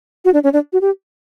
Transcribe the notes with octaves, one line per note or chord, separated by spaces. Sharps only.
F#4
D4
C#4
D4
F#4
G4